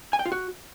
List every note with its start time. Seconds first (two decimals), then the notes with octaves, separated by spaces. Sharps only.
0.13 G#5
0.19 G5
0.26 F4
0.32 F#4